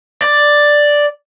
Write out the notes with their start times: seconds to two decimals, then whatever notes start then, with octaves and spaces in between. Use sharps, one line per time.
0.22 D5